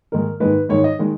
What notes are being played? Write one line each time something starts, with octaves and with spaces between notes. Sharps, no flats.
G#2 D#3 G#3 A#4
G#2 D#3 G#3 B4
G#2 D#3 G#3 C#5
D#5
D#3 G#3